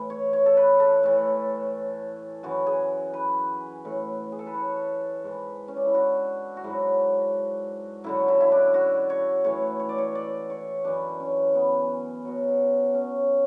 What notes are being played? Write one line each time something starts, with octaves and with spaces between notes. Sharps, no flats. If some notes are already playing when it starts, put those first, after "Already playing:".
Already playing: A2 E3
C#5
C#5
A4
B4
A4
A2 E3
F#2 E3 F#4
G#4
B4
A2 E3
G#4
A4
B4
C#5
G#2 E3
C#4
D4
E4
F#4
F#4
G#2 F#3 E4
F#2 D3 F#3 E4
E4
E4
D4
F#4
C#5
A2 E3 C#5
C#5
D5
C#5
D5
C#5
F#2 E3 D4
C#4
B3
B2 F#3
C#4